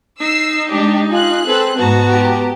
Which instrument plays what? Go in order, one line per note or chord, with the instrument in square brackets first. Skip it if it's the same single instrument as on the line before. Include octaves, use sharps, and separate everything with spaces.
[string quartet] D#4 [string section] E6 C7
[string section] G#3 D4 G4
[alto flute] F4 [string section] G#4 F#6
[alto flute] C4 [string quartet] A4 B4
[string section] G#2 [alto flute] B3 [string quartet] F#4 A5 A#5
[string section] G4